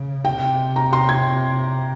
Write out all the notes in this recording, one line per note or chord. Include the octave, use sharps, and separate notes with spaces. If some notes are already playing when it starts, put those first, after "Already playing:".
Already playing: C#3
C3 G5
A#5
C6
G#6